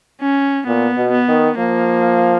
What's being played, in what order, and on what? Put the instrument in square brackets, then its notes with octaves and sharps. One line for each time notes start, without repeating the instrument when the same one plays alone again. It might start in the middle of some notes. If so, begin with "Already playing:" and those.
[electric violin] C#4
[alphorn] A#2 [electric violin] B3
[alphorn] B2
[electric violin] B3
[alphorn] D#3
[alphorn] F3 [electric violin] A#3